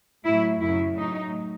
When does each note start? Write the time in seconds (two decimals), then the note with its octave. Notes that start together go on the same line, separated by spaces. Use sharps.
0.25 A2 F#3 E4
0.61 F#2 C#3 F#3 E4
0.97 A2 F#3 D#4